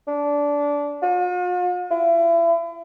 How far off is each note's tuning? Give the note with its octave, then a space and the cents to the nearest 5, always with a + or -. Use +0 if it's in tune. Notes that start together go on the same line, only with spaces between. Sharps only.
D4 -20
F4 +45
E4 +35